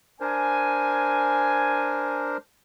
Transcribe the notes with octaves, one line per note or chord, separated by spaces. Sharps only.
D4 A#4 C5 G#5